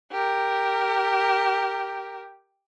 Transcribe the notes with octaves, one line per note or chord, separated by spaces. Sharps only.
G4 A#4